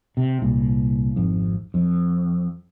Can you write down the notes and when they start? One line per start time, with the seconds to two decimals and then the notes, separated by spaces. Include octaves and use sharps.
0.17 C3
0.42 C2 A#2
1.16 G#1 F2
1.74 F2